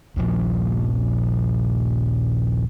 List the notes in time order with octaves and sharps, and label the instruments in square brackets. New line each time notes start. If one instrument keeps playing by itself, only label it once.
[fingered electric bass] D#1 A#1 F3